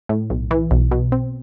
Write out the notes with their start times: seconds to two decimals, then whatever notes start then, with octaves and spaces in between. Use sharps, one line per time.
0.09 A2
0.30 B1
0.51 E3
0.71 B1
0.91 B2
1.12 C4